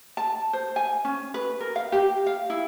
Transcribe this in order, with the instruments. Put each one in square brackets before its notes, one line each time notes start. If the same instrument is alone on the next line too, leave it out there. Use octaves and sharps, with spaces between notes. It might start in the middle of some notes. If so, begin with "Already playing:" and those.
[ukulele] A5
C5
G#5
C#4
B4
A#4
F5
G4
F5
E4